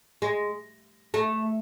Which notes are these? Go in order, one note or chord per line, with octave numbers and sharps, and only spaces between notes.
G#3
A3